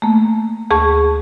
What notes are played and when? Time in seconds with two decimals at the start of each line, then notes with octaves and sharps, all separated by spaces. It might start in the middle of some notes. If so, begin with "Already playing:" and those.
0.02 A3 A#3
0.70 D2 G#4 A5 C#6